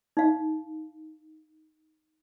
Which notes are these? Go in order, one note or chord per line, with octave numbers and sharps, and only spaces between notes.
D#4 F5